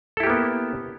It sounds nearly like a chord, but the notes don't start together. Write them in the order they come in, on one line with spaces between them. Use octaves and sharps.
A4 E4 G4 A#3 B3